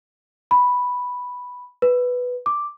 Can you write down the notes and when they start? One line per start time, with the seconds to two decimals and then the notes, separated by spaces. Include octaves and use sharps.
0.51 B5
1.82 B4
2.46 D6